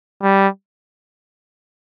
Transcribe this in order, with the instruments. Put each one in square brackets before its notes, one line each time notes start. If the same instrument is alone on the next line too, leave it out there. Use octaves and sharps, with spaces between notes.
[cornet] G3